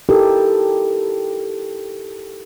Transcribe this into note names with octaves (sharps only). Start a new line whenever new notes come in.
D#4 E4 G4 A4 A#4